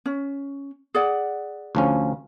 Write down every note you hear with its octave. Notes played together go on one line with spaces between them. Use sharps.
C#4
G#4 D5 F#5
D2 F3 C#4